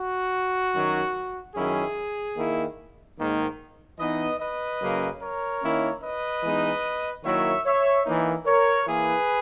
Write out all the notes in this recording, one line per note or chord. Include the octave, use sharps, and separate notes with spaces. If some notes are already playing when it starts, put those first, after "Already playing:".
Already playing: F#4
F#2 D#3 F#3
F#2 D#3 F#3 C#4 E4 G#4
D#3 A#3 E4
G#2 D#3 A#3
E3 B3 D#4 B4 D#5
B4 D#5
F#2 C#3 F#3 A#3
A#4 C#5
D#3 A#3 C#4 E4
B4 D#5
E3 G#3 B3 D#4
D#3 F#3 A#3 E4 C#5 E5
C#5 E5
E3 A#3 D#4
A#4 C#5
E3 A#3 E4 G#4 B4